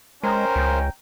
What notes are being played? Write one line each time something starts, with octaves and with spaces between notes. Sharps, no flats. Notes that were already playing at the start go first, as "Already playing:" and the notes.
G#3 C#4 A#4 C5 G5 A#5
C#2